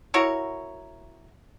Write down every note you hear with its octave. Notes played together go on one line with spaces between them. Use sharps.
E4 F#4 A#4 C#5